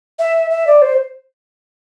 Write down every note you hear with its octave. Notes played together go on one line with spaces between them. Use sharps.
E5
E5
D5
C5